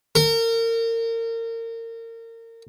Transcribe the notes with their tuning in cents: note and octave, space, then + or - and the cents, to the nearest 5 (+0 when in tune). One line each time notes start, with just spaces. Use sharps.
A#4 -30